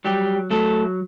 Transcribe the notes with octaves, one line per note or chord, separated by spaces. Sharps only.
F#3 G3 G4
F#3 A3 A4